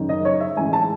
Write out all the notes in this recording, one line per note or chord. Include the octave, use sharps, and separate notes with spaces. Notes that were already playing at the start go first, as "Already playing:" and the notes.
Already playing: F#1 F#2 D#3
D#5
C#5
E5
A1 G#2 E3 G#5
A5